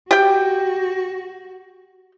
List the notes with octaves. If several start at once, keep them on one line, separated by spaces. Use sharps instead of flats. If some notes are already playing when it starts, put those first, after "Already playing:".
F#4 G4 G5